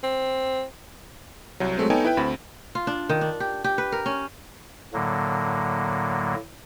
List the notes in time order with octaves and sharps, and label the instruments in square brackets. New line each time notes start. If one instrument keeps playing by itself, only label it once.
[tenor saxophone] C4
[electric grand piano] C2 F#3
F#3 G#3 A3 C4
B3 D#4 A4 C#5 G5 G#5
E4 B4 G5
D2 C4 B5
[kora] F4
D4
D#3
D4
G4
G4
B4
A#4
C#4
[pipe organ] A2 D3 F#3 A#3